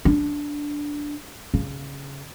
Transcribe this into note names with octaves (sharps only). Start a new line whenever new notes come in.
D4
C#3